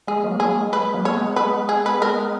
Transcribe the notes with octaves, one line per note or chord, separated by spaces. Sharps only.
G#3 G#4
F#3 A#3
F#3 A#3 G#4
G#3
G#3 B4
G#3
F#3 A#3
C#5
G#3 B3
B4
G#4
B4
A#4